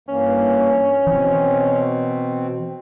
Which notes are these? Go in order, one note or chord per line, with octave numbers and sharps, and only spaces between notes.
G2 E3 A#3 C#4
B2 E3 C4